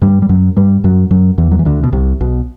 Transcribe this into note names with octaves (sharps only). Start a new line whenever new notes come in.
G2 G3
G3
F#2 F#3
G2 G3
F#2 F#3
F#2 F#3
E2 E3
F#3
E3
D2 D3
B2
C2 C3
B1 B2